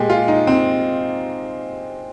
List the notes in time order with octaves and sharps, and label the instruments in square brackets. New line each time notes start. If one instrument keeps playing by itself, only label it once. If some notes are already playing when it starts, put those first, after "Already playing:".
Already playing: [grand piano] A#2 G#3 G4 G#4
F4
D#4
C4